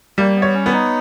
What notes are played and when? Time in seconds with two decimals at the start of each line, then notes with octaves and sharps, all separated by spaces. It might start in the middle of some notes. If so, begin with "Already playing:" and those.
0.18 G3 A#3
0.36 B3
0.42 C#5
0.54 C#4
0.66 B3
0.73 D#4